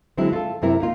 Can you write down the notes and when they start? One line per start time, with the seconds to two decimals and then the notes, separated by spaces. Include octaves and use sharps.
0.17 D3 F#3 G#3 C4 E4
0.33 F4 A4
0.62 F#2 C3 C4 E4 A#4
0.80 A#3 D#4 F4